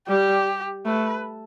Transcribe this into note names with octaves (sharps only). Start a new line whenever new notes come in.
G3 G4
A3 B4